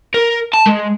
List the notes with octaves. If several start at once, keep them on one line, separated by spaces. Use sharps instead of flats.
A#4
A5
G#3